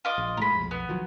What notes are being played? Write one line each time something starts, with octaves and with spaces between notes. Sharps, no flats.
F4 D#5 D6
A#1
A2 F3 G#3 A#5 B5
B1 F2
B3
D#3 F3 F#3